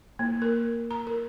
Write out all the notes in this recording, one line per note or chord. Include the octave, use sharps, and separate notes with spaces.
A#3
A#4
A#5
A#4